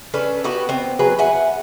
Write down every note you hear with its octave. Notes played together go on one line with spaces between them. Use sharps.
C#4 D4 A4 B4
B3 F#4 G4 B4
B3 C4
F#3 G#4 B4
E5 F#5 G#5